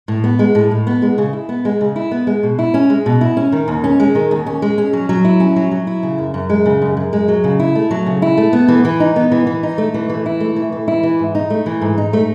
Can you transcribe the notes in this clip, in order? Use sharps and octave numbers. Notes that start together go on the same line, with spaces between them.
A2
B3
G#3
A2
A2
B3
G#3
C#3
E4
B3
G#3
C#3
E4
B3
G#3
B2
E4
C#4
G#3
B2
E4
C#4
D#3
D#2
C#4
G#3
D#3
D#2
C#4
G#3
C#4
F#3
F#3
E4
C#4
F#3
F#3
E4
C#3
F#2
F#2
G#3
C#3
F#2
F#2
G#3
F#3
C#3
E4
A3
F#3
C#3
E4
A3
B3
E3
E3
D#4
B3
E3
E3
D#4
A3
E3
E3
E4
A3
E3
E3
E4
E3
G#2
D#4
A3
E3
G#2
D#4
A3